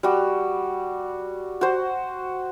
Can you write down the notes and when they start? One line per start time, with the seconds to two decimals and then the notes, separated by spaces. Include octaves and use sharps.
0.03 G3 F#4
1.61 F#4 C5